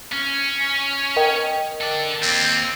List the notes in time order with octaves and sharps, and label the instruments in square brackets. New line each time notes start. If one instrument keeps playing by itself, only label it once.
[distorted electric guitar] C#4
[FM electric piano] A#4 D#5 G5
[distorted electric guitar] A4 D5
[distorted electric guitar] D#2 [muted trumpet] C4